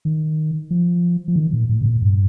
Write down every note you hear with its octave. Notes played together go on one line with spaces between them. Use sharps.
D#3
F3
F3
D#3
A#2
A2
C3
A#2
G2